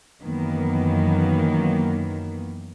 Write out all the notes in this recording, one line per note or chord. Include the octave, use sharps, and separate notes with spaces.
F#2 D#3 E3 A#3 B3